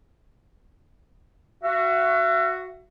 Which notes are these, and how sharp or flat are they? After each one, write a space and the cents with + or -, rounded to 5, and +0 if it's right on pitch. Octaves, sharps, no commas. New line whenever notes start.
F#4 +0 E5 +35